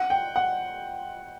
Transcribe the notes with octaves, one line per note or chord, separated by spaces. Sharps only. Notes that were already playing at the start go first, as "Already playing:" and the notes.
Already playing: F#5
G5
F#5